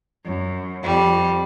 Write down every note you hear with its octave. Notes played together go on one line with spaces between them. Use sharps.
F#2
F2 G3